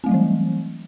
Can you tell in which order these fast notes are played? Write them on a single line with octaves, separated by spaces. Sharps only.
C4 A3 F#3 G3 E3